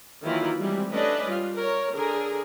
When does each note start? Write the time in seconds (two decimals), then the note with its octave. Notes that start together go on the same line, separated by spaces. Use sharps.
0.24 D#3 E3 F#3 A#3 E4 F4
0.59 E3 G3 G#3 C4
0.92 A3 C#4 D4 B4 D5 D#5
1.28 G3 F4
1.56 A#4 C#5
1.94 D3 G#4 A#4